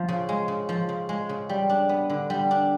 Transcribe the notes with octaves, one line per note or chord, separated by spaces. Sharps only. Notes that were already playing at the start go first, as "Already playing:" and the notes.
Already playing: F3
C#3
G#3
C#3
F3
C#3
G#3
C#3
G3
D4
B3
D3
G3
D4